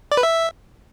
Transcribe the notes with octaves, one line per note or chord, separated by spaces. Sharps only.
D5
B4
E5